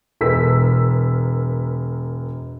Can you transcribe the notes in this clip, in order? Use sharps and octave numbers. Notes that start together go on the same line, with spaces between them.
E1 A#4 B4 E6 B6